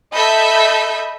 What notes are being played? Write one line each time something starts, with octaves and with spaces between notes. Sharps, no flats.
A4 D#5 E5 B5 G6